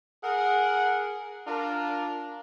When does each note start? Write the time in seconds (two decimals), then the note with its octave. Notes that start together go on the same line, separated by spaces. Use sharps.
0.24 G#4 A#4 F#5
1.46 D4 F4 A#4